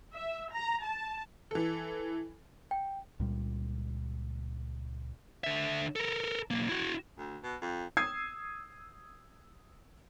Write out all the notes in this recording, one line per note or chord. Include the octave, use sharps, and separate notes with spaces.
E5
A#5
A5
E3 A4
G5
C#2 A#2 G3
D3 E5
A4 A#4
B1 A#3
E4 F#4
D2
B2
F2
D#6 E6 G#6 C7